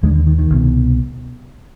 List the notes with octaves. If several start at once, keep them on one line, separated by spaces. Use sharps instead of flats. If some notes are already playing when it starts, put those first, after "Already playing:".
D#2 D3 G#3
D3
D#3
D#3
C2 B2